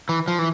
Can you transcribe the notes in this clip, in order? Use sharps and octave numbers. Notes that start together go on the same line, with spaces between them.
E3
F3
E3